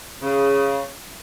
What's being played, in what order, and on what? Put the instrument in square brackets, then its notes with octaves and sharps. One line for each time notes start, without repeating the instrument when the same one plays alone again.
[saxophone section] C#3